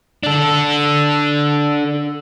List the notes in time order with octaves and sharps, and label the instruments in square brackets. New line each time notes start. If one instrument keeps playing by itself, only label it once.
[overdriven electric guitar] D4 A4